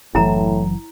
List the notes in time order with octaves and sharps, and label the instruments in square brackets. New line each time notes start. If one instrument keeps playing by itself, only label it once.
[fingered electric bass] F#1 E3 F#3 [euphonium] A2 [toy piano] E4 A#5